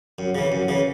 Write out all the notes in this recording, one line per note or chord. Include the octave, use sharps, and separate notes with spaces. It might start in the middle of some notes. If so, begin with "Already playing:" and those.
F#2
C#3 E3
F#2
C#3 E3